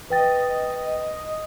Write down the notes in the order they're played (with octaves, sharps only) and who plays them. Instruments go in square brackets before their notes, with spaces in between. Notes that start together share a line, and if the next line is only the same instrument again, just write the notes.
[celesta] B4 G5 A6 [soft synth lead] D#5